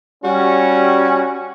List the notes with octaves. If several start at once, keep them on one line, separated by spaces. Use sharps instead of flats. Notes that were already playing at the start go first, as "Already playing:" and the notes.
G3 C#4 F#4